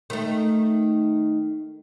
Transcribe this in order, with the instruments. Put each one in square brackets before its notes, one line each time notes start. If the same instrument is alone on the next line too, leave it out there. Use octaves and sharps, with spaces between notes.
[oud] D#3 A3